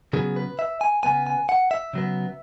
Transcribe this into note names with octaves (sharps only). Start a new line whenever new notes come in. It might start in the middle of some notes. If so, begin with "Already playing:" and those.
C#3 F#3 B3 G#4
B4
E5
G#5
C#3 F#3 B3 G#5
G#5
F#5
E5
C#3 F#3 B3